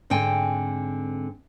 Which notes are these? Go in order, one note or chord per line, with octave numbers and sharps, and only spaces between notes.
G#2 D3 C4 G5 G#5